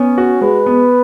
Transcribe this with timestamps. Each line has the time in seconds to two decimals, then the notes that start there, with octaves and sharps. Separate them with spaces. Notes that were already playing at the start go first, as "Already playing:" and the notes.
Already playing: B3 C#4
0.18 F#4
0.41 G#3 B4
0.66 B3